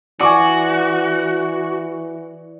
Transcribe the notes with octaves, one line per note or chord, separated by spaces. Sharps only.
E3 F#4 D5 G#5 C#6 D6